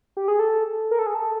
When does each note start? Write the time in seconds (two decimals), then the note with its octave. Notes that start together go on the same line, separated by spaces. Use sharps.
0.17 G4
0.28 G#4
0.39 A4
0.91 A#4
0.99 A4
1.07 G#4
1.15 A4